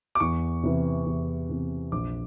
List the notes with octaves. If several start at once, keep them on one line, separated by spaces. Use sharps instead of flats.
D6
E2 C#6
C3 E3
E2
C3 E3
A#1 D6